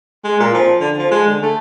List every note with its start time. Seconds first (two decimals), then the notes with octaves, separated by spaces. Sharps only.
0.24 G#3
0.40 A#2
0.54 F3
0.80 D3
0.98 F3
1.11 G#3
1.27 D3
1.42 A3